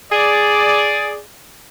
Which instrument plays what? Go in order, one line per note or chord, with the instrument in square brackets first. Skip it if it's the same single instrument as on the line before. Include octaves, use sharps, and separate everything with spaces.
[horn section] G#4 D5